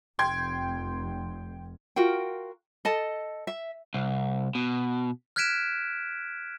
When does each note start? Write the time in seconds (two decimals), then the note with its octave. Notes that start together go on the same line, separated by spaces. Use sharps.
0.19 F1 G5 C6 G#6
1.96 F4 F#4 A#4 G5
2.85 A4 D#5 A5
3.47 E5
3.94 C2
4.55 B2
5.36 F6 F#6 G#6 B6 D7 E7